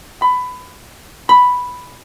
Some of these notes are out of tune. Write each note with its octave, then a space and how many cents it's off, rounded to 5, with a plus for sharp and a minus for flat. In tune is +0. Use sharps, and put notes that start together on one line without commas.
B5 +20
B5 +0